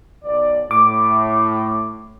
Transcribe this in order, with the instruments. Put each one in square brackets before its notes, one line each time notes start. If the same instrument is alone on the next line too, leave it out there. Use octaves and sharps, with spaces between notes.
[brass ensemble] B1 D5
[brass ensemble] A2 [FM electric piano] D6